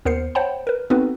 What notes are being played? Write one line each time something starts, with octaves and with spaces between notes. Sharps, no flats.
D#2 B3 A#4 C5 C7 C#7
C5 C#5 F#5 G5 A5 B5
A#4 B4
B3 C4 D#4 F#4 A4 B4